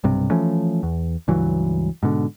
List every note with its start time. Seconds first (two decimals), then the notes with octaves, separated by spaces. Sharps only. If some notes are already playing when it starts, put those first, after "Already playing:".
0.04 B1 G2 C3
0.30 E3 F3 A3 C#4
0.83 E2
1.28 C#2 G2 E3 F#3
2.03 G#2 B2 D3